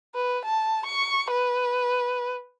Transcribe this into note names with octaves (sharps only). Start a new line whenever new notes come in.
B4
A5
C#6
B4